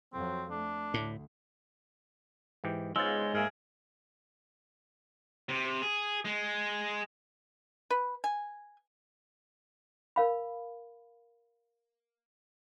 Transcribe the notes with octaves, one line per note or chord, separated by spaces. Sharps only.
F2 F#3 C4
A3 D4
D2 A2
G#2 E3 G4
G#2 C#3 G#3 B3 F4 E6 A6
G#2 A#3 G#4 A#4 E5
C3
G#4
G#3
B4
G#5
A#4 F5 B5